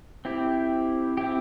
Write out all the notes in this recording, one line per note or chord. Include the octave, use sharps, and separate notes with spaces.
C4 E4 G4
C4 E4 G4